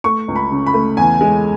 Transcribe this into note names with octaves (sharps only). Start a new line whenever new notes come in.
A3 C#6
C#2
B5
C#3
B5
A3
E2 G#5
G#3